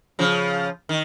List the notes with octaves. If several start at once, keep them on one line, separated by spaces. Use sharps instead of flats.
C#3 F3
D#3